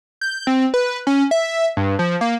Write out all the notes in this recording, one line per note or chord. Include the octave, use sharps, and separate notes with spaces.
G6
C4
B4
C#4
E5
G2
F3
A#3